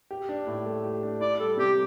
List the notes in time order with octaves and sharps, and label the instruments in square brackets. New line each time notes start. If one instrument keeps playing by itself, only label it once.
[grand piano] G4
D4
A2
A3
G4
D4
[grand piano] E4 [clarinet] D5
[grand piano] G3 [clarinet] A4
[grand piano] C3 [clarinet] G4